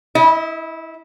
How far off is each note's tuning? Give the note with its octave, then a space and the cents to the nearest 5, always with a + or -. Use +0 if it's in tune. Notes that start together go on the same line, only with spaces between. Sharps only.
E4 -15 D#5 +30